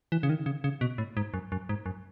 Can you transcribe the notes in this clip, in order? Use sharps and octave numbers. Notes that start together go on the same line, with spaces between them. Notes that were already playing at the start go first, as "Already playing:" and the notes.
E3
C#3
D#3
C#3
C#3
B2
A2
G#2
F#2
F#2
G#2
F#2